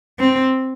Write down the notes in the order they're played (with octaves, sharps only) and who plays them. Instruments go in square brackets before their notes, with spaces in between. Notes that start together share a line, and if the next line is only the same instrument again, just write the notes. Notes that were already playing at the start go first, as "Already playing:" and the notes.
[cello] C4